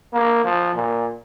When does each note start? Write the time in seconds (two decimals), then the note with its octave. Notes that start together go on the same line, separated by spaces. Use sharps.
0.13 A#3
0.44 F3
0.74 A#2